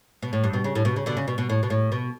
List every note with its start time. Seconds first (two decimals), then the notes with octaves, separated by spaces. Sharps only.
0.22 B2
0.33 A2
0.44 G2
0.53 B2
0.64 C#3
0.75 A2
0.85 B2
0.96 C#3
1.06 B2 D3
1.17 C#3
1.28 B2
1.38 B2
1.50 A2
1.63 B2
1.70 A2
1.92 B2